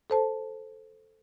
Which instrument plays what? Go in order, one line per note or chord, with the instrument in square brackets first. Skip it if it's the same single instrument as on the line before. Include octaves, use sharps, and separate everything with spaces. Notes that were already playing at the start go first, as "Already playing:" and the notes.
[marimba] A4 C5 A5